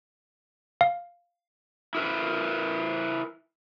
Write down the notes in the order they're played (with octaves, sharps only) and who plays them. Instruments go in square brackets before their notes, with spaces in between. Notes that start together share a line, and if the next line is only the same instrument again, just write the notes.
[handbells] F5
[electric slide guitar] E4 A#4 B4